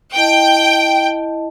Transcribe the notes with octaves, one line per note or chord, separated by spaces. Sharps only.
E4 D#5 G5 A5